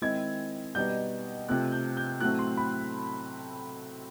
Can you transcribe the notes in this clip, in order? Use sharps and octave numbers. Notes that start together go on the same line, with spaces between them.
D#3 G#3 C4 E4 G#6
B2 G3 B3 D#4 G6
C3 F3 A3 C4 F#6
G6
G6
A2 F#3 A3 C4 F#6
C6
B5